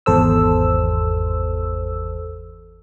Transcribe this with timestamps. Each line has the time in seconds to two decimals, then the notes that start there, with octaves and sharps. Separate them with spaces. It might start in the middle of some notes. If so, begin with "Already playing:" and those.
0.06 G#1 E2 A4 C5 E6